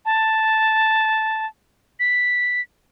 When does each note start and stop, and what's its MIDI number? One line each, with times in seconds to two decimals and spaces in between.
0.05 1.46 81
2.00 2.61 95